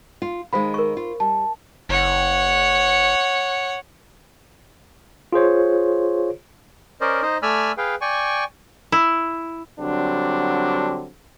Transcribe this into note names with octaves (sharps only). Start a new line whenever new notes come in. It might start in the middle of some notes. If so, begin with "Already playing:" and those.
F4
D#3 G#3 C5 F5 B5
A#4 C#6
F4
G3 A5
F#1 C#5 F#5
F4 G#4 C5 C#5
C#4 A#4 C5 D5 D#5
D#4 C5 D#5
A3 D5 G#5 B5 E6 F6
G#4 B4 F5 G5
D5 G5 G#5 C#6
E4
D3 F#3 G3 C4 D4